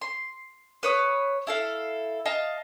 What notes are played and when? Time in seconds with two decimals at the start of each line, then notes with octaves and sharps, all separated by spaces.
0.01 C6
0.83 B4 C#5 D#6
1.47 E4 A4 F5
2.26 D#5 F5 A5